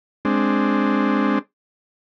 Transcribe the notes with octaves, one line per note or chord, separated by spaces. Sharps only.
G#3 C4 D4